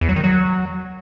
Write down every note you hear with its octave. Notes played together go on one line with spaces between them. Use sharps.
E2
F#3
D#3
F#3